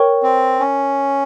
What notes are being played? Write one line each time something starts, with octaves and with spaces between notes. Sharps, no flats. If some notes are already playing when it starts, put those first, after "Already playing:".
Already playing: A#4 C#5 G5 C#6
C4
C#4